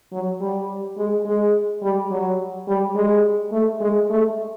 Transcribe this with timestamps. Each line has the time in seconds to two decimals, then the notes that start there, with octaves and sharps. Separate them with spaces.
0.13 F#3
0.41 G3
0.98 G#3
1.26 G#3
1.83 G3
2.11 F#3
2.68 G3
2.95 G#3
3.52 A3
3.81 G#3
4.10 A3